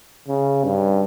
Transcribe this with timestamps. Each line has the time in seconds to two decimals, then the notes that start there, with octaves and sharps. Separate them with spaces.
0.28 C#3
0.64 G2